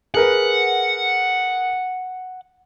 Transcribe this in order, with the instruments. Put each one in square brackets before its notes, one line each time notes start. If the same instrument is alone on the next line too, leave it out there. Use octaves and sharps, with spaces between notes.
[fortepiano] G#4 A#4 B4 [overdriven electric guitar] F#5